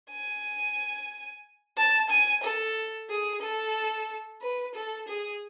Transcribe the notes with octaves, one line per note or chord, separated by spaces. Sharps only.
G#5
A5
G#5
A4
G#4
A4
B4
A4
G#4